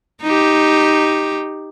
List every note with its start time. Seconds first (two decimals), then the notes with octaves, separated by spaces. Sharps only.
0.22 D#4 G4